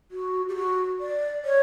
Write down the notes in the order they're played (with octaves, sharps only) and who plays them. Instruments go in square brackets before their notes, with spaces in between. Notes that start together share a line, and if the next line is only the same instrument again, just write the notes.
[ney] F#4
G4
F#4
D5
C#5